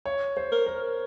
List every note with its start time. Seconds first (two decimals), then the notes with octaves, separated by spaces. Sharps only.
0.06 C#5
0.37 C5
0.52 A#4
0.66 A#4